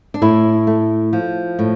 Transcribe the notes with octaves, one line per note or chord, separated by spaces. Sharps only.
D4
A2 E4
A3
F3
A2